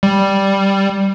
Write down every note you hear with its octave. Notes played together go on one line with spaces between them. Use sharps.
G3